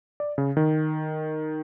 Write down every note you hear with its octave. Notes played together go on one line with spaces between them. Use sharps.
D5
C#3
D#3